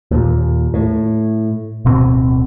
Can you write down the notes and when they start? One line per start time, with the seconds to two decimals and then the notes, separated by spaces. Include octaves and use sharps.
0.11 D#2 A#2
0.74 A2
1.85 D1 B2 C4